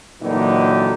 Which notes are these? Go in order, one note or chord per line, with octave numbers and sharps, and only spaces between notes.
A#2 D3 E3 F#3 D#4 G4